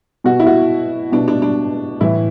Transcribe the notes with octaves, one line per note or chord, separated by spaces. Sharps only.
B2 F#4
E4
F#4
B2 D4
D4
D4
A2 E3 E4